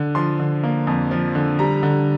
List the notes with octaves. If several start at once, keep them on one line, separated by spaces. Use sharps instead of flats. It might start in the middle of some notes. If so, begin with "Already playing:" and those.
Already playing: D3
F3 C6
D3
A#3
F2
F3
D3
G3 A#5
D3